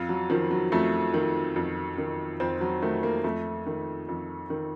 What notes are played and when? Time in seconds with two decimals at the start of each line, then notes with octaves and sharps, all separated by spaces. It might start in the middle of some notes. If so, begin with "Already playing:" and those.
Already playing: F2 F4
0.09 F#3
0.30 D#3 F3
0.51 F#3
0.72 F2 A3
1.14 D#3
1.56 F2
1.98 D#3
2.40 F2 C4
2.61 F#3
2.82 D#3 A3
3.03 A#3
3.24 F2 A3
3.66 D#3
4.09 F2
4.50 D#3